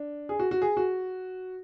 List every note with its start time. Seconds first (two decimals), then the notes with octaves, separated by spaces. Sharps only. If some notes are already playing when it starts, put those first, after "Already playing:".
Already playing: D4
0.29 G#4
0.39 F#4
0.51 F#4
0.62 G#4
0.77 F#4